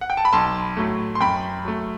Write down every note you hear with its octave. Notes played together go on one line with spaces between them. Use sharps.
F#5
G5
A5
B5
B1 A5 C6
A2 F#3 A3
C6
F#2 G5 B5
F#3 A3